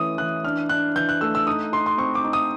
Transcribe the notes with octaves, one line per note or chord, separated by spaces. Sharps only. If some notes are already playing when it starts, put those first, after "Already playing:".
Already playing: E3 A3 C#4 D#6
E3 F#6
D4 F6
D4 F#6
E3 G6
F#6
A3 E6
E6
D#4 D#6
D#4 C6
C6
C4 C#6
D6
D#4
D#6